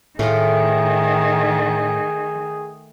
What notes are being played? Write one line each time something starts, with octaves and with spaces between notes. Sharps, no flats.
A2 D#3 A3 F4 G#4